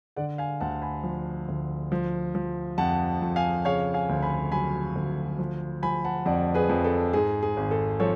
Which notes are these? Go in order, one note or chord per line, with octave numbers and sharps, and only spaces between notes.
D3 D5 F#5
F5 G#5
D2 F#5 A5
G#5 B5
F3
D2
F3
F3
F2 F#5 A5
F2
F5 G#5
C#3 C#5 F5
F5 G#5
D2
G#5 B5
F#3 G#5 B5
D2
F3
F3 G#5 B5
F#5 A5
F2 D5 F#5
G#4 B4
F2
A4
G#2 G#4
G#4
G#1
A4
F3 A4 C#5